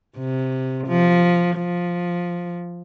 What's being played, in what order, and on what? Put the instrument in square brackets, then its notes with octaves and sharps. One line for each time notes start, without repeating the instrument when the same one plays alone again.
[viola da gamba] C3
F3
F3